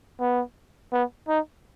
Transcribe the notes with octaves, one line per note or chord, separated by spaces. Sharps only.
B3
B3
D#4